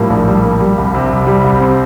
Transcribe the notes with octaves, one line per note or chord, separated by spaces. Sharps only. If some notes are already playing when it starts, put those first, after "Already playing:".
Already playing: A2 F3 G3 A#3
A#1
G3
A#3
G3
C2
C3
C2
G3
C2
C4